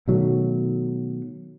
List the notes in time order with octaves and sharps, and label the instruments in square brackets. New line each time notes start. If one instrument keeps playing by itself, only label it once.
[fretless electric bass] B2 D#3 F#3 A3